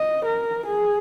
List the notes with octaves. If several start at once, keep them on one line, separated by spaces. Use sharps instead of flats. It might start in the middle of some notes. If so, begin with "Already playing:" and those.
Already playing: D#5
A#4
G#4